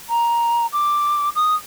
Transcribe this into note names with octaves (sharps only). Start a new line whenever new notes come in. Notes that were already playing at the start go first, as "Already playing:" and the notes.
A#5
D6
D#6